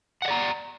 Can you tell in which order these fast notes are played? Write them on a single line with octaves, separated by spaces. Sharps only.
F#5 D#5 D5 A#5